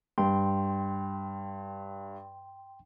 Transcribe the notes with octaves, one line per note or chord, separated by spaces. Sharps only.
G2 G5 C6